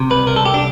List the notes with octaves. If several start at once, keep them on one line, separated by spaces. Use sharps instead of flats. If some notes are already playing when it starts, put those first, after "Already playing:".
Already playing: C3
C2 B4
C2 A#4
A4
C2 G4
D4